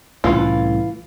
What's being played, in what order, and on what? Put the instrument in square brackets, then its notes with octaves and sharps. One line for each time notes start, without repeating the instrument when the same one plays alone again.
[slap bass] C2 A2 C#4 [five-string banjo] E3 F4